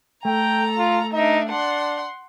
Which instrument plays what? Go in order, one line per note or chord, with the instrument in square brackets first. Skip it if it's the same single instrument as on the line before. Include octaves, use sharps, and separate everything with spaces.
[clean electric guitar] A3 [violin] A4 A#5 [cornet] G5
[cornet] F4
[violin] D4 E5 [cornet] D#4
[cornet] D4 [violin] F#5 C6